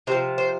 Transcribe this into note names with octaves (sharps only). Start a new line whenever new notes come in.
C3 F3 C5
C5